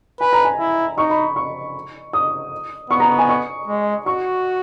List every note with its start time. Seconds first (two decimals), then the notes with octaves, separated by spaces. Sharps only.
0.21 B4 G#5
0.33 A#5
0.45 G#5
0.59 E4
0.98 D#4 C#6
1.10 B5
1.36 C#6
2.13 D#6
2.90 B3 C#6
3.00 A#5
3.19 G#5
3.29 C#6
3.67 G#3
4.06 F#4 C#6